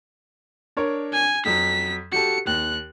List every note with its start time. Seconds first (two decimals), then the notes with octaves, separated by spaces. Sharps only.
0.77 D4 A#4 C#5
1.12 G#5
1.45 F2 F#3 B6
2.12 F#4 G4 A4 C#7
2.47 D#2 F#6